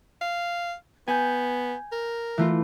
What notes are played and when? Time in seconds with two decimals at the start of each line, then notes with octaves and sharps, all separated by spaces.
0.21 F5
1.08 B3 G#5 G6
1.92 A#4
2.38 E3 A3 F4